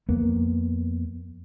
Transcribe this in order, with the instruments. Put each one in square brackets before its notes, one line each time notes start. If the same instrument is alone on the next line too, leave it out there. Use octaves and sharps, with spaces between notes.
[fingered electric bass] F2 A#3 B3